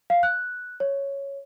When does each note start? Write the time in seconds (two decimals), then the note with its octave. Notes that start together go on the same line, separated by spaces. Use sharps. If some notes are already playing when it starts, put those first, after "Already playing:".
0.10 F5
0.23 F#6
0.80 C#5